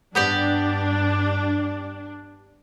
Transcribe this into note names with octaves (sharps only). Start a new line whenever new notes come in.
G2 G3 B3 D4 G4 D5